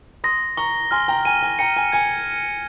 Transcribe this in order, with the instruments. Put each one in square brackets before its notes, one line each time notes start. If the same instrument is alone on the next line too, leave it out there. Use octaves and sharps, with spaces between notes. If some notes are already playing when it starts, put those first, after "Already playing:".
[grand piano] C6 D#6 [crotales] A#6
[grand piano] A#5 C#6 [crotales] G7
[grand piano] G#5 C6 [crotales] F6
[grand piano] G5 A#5
[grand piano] G#5 [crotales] D#7
[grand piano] G#5
[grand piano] G5 A#5 [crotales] C#7
[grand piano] G#5
[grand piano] G#5 [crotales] G#6